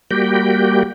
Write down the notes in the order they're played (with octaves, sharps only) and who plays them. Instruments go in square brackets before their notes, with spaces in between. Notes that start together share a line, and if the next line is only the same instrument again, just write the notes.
[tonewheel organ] G3 A#3 F#4 G4 G5